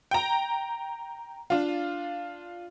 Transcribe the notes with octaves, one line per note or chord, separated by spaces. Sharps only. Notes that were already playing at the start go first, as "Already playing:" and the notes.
G5 A#5
D4 F4